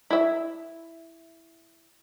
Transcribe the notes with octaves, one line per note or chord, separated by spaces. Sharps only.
E4 E5